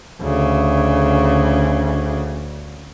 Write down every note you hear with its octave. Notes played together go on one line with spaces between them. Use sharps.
D2 C#3